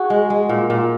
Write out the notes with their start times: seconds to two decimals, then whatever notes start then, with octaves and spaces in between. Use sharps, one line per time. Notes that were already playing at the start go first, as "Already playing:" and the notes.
Already playing: F#4 G#4
0.10 G#3
0.30 G#3
0.49 A#2
0.70 A#2